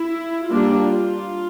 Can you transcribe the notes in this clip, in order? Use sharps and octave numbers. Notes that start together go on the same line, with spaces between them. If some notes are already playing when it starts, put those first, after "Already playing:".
Already playing: E4
G3 A#3 D4 F4